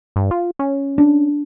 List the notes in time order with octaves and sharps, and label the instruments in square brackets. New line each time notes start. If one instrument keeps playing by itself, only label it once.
[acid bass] G2
F4
C#4
[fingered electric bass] D4